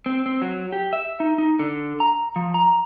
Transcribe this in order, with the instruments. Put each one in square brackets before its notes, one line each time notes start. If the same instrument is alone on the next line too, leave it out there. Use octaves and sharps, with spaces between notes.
[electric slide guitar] C4
C4
F#3
G4
E5
D#4
D#4
D3
A#5
F3
A#5